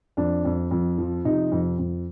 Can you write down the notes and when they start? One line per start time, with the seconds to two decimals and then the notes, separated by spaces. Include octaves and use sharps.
0.17 F2 D4
0.45 F2
0.71 F2
0.98 F3
1.25 C3 D#4
1.52 F2
1.78 F2